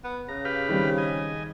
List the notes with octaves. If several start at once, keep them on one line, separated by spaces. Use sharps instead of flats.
B3
C#3 A#5
G4 B4 F5
D#3 G3 C4
D#5 G#5